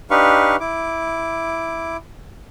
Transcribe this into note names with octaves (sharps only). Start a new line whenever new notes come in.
D4 D#4 G4 B4 F5 C#6
E4 D6